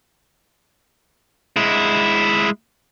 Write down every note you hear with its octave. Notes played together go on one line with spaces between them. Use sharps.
G#3 E4